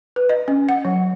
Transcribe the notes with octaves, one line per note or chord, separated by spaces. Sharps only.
B4
D#5
C#4
F#5
F#3